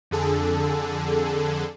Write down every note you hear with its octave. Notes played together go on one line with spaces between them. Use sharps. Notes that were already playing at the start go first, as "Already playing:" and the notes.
F2 D3 G#4 A4